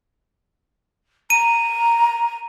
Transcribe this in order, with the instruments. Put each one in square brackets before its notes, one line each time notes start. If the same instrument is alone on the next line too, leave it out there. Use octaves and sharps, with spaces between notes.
[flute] A#5 [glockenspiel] D#7